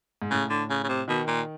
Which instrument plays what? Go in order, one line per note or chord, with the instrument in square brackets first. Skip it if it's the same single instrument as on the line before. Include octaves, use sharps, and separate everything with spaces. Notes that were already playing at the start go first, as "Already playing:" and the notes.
[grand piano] G#2
[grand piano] A2 [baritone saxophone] C#3
[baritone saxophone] D3
C#3
C#3
C3
[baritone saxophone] B2 [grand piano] D#3
[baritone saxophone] A#2